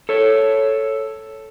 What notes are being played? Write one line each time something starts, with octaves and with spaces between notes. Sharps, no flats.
A4 C#5